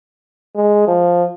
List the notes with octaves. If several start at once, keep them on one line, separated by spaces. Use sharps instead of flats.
G#3
F3